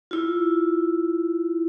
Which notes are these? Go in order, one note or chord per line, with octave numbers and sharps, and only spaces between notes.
E4 F4